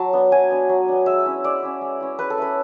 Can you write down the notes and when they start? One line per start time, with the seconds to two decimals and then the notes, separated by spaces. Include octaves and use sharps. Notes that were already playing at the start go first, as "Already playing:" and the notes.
Already playing: F#3 A5
0.13 B3 D4
0.31 F#3 G#5
0.50 B3 D4
0.69 F#3
0.88 B3 D4
1.06 G#3 E5
1.25 C#4 E4
1.44 G#3 D5
1.63 C#4 E4
1.81 G#3
2.00 C#4 E4
2.19 G#3 B4
2.30 A4
2.38 C#4 E4 B4